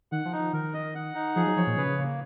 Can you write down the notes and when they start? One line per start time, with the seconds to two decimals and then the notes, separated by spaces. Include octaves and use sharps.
0.12 D#3 F#5
0.25 F3
0.32 D#4
0.39 F3
0.53 D#3 A#4
0.74 D#5
0.95 F#5
1.15 D#4
1.36 F3 G#4
1.46 F#3
1.56 F3 C#5
1.67 A#2
1.77 C#3 B4
1.98 A#3